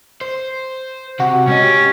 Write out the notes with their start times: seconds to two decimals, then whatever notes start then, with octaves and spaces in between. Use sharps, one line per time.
0.21 C5
1.20 C3 F#4
1.47 G#2 C#4 D#5
1.62 G4